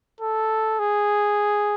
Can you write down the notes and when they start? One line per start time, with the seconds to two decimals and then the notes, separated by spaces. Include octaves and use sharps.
0.21 A4
0.79 G#4